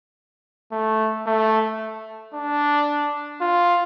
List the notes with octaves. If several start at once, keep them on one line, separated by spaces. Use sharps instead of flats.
A3
A3
D4
F4